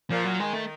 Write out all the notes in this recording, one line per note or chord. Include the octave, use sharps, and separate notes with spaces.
A#2 F3
F#3
D#3 G#3
A3